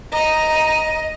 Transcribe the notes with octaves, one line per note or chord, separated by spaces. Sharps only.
D#5 A#5